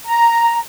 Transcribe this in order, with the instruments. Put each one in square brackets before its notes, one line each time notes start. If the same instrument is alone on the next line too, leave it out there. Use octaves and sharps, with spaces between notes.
[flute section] A#5